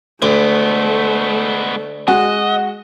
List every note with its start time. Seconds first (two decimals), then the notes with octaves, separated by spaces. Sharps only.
0.22 D2 G#3 A3 B3
2.08 G#3 F#4 D#5